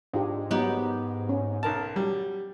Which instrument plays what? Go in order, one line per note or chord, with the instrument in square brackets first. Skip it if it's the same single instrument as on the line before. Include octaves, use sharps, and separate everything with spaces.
[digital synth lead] G#2 [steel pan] D4 F4 G4
[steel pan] F#3 D#4 [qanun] B3 G4
[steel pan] C#4
[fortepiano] B1 A#4 A5
[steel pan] F#3 [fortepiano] G3